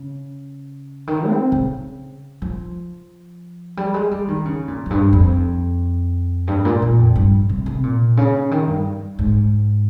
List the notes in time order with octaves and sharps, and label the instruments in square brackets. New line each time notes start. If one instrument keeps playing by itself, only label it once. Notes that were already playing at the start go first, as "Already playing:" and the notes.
Already playing: [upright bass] C#3
D#3
C4
C#3
F3
G3
G#3
G3
D#3
C#3
A#2
F2
G2
F2
G2
A#2
A#2
F2
G2
C3
C3
A#2
C#3
D#3
G2
G#2